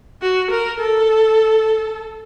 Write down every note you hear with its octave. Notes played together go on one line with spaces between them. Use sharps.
F#4
A#4
A4